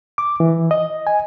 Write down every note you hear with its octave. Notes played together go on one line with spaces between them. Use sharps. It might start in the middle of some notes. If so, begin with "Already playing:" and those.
D6
E3
D#5
G#5